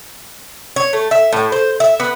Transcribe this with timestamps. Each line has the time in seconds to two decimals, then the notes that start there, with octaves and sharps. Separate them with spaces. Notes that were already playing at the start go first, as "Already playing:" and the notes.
0.76 C#5
0.93 A3
1.11 E5
1.33 A2
1.52 C5
1.80 E5
2.00 B3